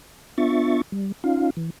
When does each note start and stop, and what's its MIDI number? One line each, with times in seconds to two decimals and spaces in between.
0.38 0.81 59
0.38 0.81 62
0.38 0.81 65
0.38 0.81 76
0.38 0.81 85
0.38 0.81 93
0.92 1.12 55
1.24 1.50 61
1.24 1.50 63
1.24 1.50 65
1.24 1.50 77
1.57 1.70 52